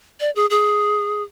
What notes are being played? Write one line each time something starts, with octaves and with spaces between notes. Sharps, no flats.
D5
G#4
G#4